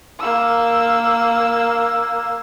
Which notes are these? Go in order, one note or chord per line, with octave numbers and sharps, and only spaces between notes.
A#3 E6